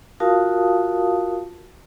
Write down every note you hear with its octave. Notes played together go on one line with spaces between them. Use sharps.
F4 F#4 A#4 F5 A5 D#6